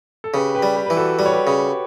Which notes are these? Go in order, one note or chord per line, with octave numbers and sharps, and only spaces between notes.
A4
C#3 G4 B4
G4 B4
G3
G4 B4
E3 B4
F#4 A4
G3 B4
C#5
G4 B4
C#3